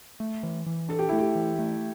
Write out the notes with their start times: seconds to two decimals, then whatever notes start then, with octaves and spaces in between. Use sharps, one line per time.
0.20 A3
0.43 E3
0.66 E3
0.89 D4 A4
0.99 G4
1.09 A3 E4
1.19 G4
1.35 E3
1.59 A3